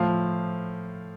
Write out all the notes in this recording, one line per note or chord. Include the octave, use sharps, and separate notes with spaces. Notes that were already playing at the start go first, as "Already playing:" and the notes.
Already playing: A2 F3 F5